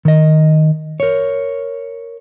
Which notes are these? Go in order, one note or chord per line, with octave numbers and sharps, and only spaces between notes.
D#3 D#5
A#4 C#5